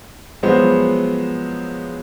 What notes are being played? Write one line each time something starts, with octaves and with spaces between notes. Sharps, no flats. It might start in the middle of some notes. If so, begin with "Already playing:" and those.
F3 F#3 G#3 B3 C5